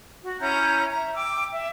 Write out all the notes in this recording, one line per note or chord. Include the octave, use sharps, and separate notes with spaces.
F#4
C#4 E4 A#5 G6
E5 A#5
G5 D6 E6
E5